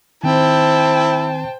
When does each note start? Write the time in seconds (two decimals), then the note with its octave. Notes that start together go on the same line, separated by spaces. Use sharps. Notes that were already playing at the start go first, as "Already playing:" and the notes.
0.24 D#3 C4 E4 C5 G5 A5